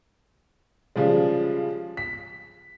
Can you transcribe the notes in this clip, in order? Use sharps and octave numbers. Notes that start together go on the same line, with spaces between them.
C#3 F3 G3 G#3
B6